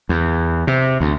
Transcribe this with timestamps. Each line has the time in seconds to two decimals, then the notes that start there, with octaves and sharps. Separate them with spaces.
0.09 E2
0.67 C3
1.00 D2